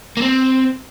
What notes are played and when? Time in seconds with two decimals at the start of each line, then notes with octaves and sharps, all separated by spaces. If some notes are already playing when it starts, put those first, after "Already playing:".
0.17 A#3
0.22 C4